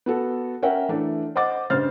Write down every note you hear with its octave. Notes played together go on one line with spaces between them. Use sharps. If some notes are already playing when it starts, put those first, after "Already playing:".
B3 F#4 A4
C#4 A#4 E5 F#5 G5
E3 A3 D4
C5 D#5 F#5 D6 A6
G2 C#3 C5 F6 A6